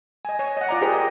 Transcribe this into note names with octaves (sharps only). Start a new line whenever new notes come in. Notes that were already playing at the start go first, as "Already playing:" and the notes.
D#5 G#5
C#5 G#5
D#5 F#5
F4 D5 A#5
G4 G#4 A#4 C5
D#5 G5